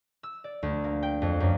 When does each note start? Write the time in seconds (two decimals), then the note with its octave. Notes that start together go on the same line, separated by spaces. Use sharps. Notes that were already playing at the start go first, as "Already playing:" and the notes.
0.23 E6
0.44 D5
0.63 D2
0.84 A#3
1.03 G5
1.22 F2
1.40 F#2